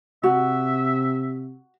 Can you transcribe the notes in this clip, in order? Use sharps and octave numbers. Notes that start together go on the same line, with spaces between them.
C3 F#4 E5